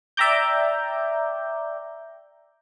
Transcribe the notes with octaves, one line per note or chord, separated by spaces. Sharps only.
D5 E5 G5 A#5 D6 G6